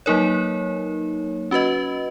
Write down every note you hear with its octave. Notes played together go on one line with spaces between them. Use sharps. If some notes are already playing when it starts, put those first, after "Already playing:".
F#3 A#3 D#4 A#4 C#5
C#4 F#4 B4 D#5